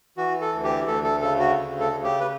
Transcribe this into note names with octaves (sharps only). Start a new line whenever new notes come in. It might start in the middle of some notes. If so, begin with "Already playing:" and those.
E3 F#4
A4
D2
G4
D2 A4
A4
C#3 A4
F#4
D2
A4
C#3
G4
B4